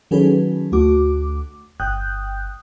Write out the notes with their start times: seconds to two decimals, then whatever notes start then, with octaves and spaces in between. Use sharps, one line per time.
0.11 D#3 F#3 C#4 G#4 A4 B4
0.72 D2 A3 F#4 D6
1.80 G1 G5 D#6 F#6 G6